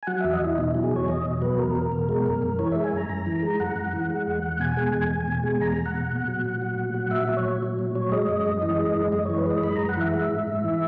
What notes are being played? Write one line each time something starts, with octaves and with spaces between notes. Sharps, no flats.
G#5
F#3 F#5
E2 E5
D#5
E2 E4
B2 D#4
F#3 E4
G#4
E2 C#5
E2 D#5
B2
F#3 B4
E2 A#4
E2
B2
G#3
F#2
F#2
E3 C#5
G#3 E5
G#5
F#2 A#5
F#2 A#5
E3
G#3
F#2 F#5
F#2
E3
G#3
E2
E2
B2 G#5
G#3
E2
E2
B2
G#3
E2 A#5
E2
F#5
B2
A#2
F#3
A#2
F#3
A#2
F#3
A#2 E5
F#3
C#5
A#2
F#3
A#2
F#3 C#5
G#3 D#5
F#2
F#2
E3
G#3
F#2
F#2 D#5
E3 C#5
B4
G#3 D#5
F#2 B5
F#2 A#5
F#5
E3 E5
G#3
G#2
G#2
E3